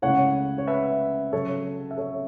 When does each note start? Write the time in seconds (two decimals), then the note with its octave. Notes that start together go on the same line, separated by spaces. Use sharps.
0.02 C#2 C#3 A3 E4 C#5 F#5
0.58 C#5
0.68 B4 E5
1.33 C#3 F#3 C#4 A4 C#5
1.91 E5
1.98 A4 C#5